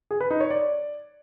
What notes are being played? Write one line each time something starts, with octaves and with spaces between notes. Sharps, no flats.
G#4
B4
D#4
C#5
D5